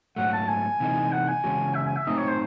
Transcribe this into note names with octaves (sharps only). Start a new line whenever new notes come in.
G#2 F#3 A3 F#5
A5
G#5
C3 E3 G#3 D#4
F#5
G#5
C#3 E3 G#3 C#4 F#4
E5
G#5
E5
A2 F#3 A3 C4 D#4 D#5
C#5
C5